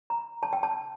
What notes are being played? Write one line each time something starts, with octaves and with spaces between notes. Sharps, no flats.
A#5
A5
G5
A5